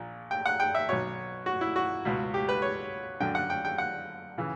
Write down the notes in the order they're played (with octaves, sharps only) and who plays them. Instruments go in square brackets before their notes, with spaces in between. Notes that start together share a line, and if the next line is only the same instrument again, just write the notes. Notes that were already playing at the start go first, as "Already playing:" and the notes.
Already playing: [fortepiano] A#1 A#2
G5
F#5
G5
E5
B1 B2 C#5
F#4
E4
F#4
C#2 B2
G4
B4
C#5
F#2 D3 G5
F#5
G5
G5
F#5
C#3 E3